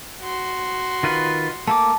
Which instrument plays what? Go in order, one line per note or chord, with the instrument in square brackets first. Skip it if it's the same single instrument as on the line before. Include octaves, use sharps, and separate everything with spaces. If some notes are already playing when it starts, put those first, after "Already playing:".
[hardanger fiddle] F#4 C6
[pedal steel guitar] D#3 F4 B4
[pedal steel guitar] A3 A#3 D6 [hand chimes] A5